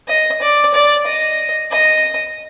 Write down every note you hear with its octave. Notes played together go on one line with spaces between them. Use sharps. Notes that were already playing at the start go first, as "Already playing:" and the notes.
D#5
D5
D5
D#5
D#5